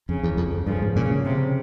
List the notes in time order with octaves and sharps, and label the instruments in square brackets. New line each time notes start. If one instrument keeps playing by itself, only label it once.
[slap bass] F2 [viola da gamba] C#3
[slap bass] E2
F2
F2
[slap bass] G2 [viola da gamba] C#3 F3
[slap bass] G#2
[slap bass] A#2 [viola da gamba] C#3
[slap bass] C#3
[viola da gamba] C3